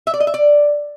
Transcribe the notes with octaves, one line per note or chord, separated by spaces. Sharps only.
E5
D5
D#5
E5
D5